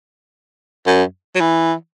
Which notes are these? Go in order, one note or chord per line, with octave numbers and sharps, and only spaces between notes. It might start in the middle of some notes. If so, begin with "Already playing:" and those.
F#2
F#3
E3